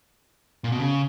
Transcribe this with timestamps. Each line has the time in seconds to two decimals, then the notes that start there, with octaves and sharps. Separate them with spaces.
0.64 A#2
0.72 B2
0.79 C#3